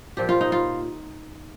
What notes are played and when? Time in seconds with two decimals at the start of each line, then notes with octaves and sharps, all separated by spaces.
0.17 A#2 F3 G4
0.29 F4
0.41 D#4
0.52 F4